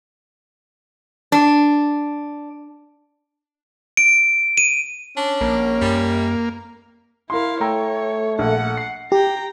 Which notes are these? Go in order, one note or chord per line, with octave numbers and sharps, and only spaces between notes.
D4
D7
D#7
C#4 D4
A#1 A#3
F#2 G3
E4 A#4 F5 C6
A3 C#5 G5 A#5 E6
A#1 F#5
C7
G4 G5 A#5